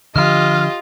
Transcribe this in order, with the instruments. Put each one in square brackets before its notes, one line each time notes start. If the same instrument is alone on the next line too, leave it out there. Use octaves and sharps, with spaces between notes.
[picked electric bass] D3 F3 [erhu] F4 [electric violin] G4 D#5 [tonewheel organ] F6